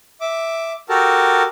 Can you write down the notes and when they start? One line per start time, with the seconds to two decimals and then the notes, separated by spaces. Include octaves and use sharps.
0.21 E5 D6
0.89 F#4 G4 A4 A#4 A5